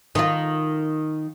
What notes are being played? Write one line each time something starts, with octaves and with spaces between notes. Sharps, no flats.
D#3 F4